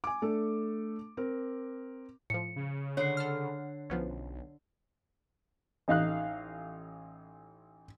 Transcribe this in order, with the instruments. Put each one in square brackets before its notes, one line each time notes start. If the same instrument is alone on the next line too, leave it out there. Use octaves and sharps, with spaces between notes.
[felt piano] G#5 D6
A3 D4 A4
C4 A#4
[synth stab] A2 F3 [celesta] C#7
[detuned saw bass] C#3
[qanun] D3 F#5 [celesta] C#5 C7
[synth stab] A4 F6
[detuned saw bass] B1 [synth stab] F3 B3 C#4
[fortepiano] A1 D#4 F5 F#6